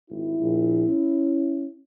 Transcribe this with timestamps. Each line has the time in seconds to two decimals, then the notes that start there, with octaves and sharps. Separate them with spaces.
0.10 G#1 E4
0.40 A#1
0.88 C#4